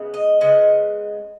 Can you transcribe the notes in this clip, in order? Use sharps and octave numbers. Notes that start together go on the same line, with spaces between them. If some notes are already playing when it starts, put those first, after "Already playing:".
Already playing: C#3 G#3 B3
D#5
C#3 G#3 B3 D#5